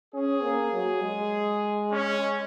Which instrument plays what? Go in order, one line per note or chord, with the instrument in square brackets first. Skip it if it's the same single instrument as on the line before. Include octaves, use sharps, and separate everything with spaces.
[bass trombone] C#4 [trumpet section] G#4
[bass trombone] A#3
F#3
G#3
[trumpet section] C#4